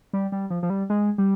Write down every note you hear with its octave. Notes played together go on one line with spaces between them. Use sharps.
G3
G3
F3
F3
G3
G#3
G3